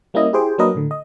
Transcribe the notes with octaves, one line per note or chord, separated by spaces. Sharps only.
G3 A#3 C#4 E4 D#5
E4 G4 G#4 C5 G5
F#3 A#3 D4 A#4 B4 D#5
A2 D3
D#5